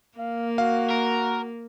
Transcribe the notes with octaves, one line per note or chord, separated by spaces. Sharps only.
A#3 F5
F#4 F5
A#4